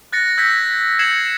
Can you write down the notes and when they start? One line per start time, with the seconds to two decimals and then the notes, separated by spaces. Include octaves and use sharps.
0.12 F#6 A6 A#6 C#7
0.38 E6 G6 G#6 A#6 B6
0.99 G#6 C7 C#7 E7 F#7